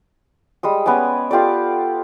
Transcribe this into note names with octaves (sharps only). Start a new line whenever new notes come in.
G3 G#3 D#6
B3 C#4 D5 G#5
F4 G4 A4 D5